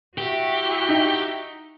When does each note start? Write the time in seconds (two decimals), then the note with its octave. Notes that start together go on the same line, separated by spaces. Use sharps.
0.18 E4 F#4 G4
0.89 D#4